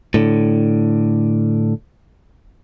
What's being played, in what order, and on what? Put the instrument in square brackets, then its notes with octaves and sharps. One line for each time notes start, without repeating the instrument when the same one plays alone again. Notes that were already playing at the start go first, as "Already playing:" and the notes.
[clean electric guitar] A2 D3